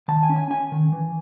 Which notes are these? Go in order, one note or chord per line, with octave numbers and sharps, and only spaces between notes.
D#3 A5
G#5
C#4
G#5
C#4 G#5
D#3
E3